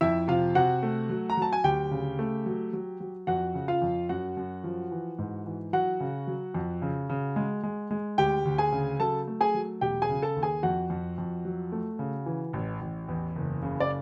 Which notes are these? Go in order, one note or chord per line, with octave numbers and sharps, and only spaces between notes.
F2 E4 E5
C3 F4 F5
C3 F#4 F#5
A3
F#3
A#5
F#3 A5
G#5
D2 G4 G5
C#3
A3
F#3
F#3
F#3
F2 F#4 F#5
C#3
F4 F5
F2
F#2 F#4 F#5
F#2
F3
E3
G#2
E3
F#3 F#4 F#5
C#3
F#3
F2
C#3
C#3
G#3
G#3
G#3
D2 G4 G5
D2
G#4 G#5
C#3
F#3 A4 A5
A3
G#4 G#5
F#3
E1 G4 G5
G#4 G#5
C#3
A4 A5
D#2
G#4 G#5
F2 F#4 F#5
F2
F2
F#3
A3
C#3
E3
A1
A1
E2
F#1
C#3
D5